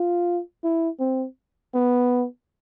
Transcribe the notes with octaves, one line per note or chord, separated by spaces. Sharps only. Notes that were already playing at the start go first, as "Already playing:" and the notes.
Already playing: F4
E4
C4
B3